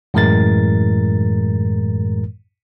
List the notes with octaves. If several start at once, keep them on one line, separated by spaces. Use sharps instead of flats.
F#2 A2 E3 G#3 A#4 A6